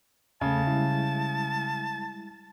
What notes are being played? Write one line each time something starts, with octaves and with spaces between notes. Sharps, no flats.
E2 C#3 A3 A5
G3 G#3 E4